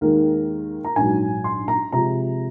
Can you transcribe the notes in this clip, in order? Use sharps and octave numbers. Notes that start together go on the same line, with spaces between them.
D#2 D#3 G#3 A#4
A#5
A#1 G#2 F#3 G#5
C6
A#5
C3 F3 G#3 A#5